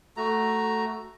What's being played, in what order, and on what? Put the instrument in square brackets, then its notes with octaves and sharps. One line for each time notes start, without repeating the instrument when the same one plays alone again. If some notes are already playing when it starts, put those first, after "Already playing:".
[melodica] A3 F#4 A#5